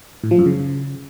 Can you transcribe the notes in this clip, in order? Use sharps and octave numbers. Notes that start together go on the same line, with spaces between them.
A2
F3
F#2
C#3